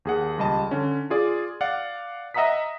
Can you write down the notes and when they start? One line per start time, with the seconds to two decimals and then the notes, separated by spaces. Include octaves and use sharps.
0.05 D#2 G#4 F#5
0.38 C#2 G3 D#5 A5
0.71 D3 C#4
1.10 F4 G#4 D5
1.61 D5 F5 F#5
2.34 D#5 E5 F#5 A#5 D#6 B6